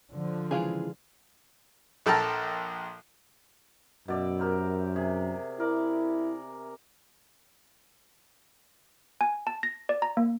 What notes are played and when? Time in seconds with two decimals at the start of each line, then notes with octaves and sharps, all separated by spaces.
0.12 D3 F3
0.51 C#3 E3 G#3 F4 G#4
2.06 A#1 A4 G5 A5 A#5 F6
4.08 F#2 B2 D5 E5
4.39 G4 A#4 C5
4.96 C3 G#4
5.60 E4 A#4 D5
9.21 G#5
9.47 A5
9.63 A#6
9.89 D5
10.02 A#5
10.17 A#3